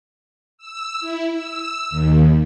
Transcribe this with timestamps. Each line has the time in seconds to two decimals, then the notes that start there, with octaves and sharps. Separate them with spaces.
0.58 E6
1.00 E4
1.33 E6
1.90 D#2